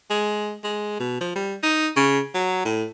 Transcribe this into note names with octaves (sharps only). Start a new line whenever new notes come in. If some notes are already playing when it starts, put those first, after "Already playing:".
G#3
G#3
B2
F3
G3
D#4
C#3
F#3
A2